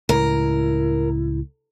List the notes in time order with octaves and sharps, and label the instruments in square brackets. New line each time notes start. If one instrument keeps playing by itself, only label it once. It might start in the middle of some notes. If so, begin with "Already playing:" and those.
[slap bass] C#2 A2 [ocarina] E4 [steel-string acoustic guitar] A#4